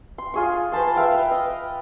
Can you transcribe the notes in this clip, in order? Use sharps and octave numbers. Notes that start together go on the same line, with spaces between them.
C6
F4 G#4 C#6
B4 C5 A5 C6
B4 E5 F5 G5
B4
D#5